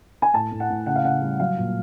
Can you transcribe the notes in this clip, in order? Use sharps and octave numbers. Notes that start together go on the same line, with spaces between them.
G#5
A2 A5
A2
F#5
A2
C#3 F#5
F5
C#3 F#5
G3
F#3 F5
A#2